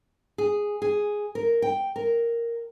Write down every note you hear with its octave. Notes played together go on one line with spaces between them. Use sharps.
G#4
G#4
A#4
G5
A#4